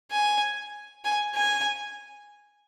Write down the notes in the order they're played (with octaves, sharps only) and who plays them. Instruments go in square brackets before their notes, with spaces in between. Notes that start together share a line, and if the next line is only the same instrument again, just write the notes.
[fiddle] G#5
G#5
G#5